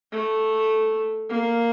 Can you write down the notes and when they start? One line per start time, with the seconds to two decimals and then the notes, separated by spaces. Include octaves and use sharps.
0.12 A3
1.30 A#3